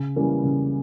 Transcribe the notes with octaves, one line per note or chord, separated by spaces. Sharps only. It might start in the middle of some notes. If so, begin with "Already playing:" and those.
Already playing: C#3
E3 G3 A#3 C#4
C#3